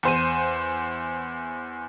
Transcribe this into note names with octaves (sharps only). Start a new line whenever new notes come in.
E2 C5 D#7